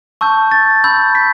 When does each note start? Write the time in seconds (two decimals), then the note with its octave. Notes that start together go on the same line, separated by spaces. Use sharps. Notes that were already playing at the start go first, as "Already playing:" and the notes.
0.21 A5 C#6 E6 G6
0.51 A6
0.84 B5 E6 G6
1.15 B6